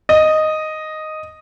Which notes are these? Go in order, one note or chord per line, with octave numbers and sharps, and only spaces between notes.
D#5